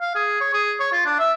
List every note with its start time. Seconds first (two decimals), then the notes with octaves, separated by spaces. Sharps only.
0.01 F5
0.15 G#4
0.41 C#5
0.53 G#4
0.80 C#5
0.92 F4
1.05 D4
1.19 E5